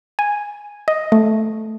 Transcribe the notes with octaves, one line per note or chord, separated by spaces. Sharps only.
G#5
D#5
A3